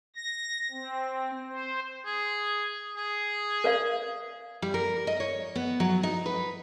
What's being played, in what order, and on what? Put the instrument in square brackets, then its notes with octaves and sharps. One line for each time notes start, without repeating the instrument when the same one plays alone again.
[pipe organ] A#6
C4
C5
[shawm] G#4
G#4
[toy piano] A#4 D5 F5
[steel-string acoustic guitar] G3
A#4
D#5
C#5
B3
F#3
D#4
B4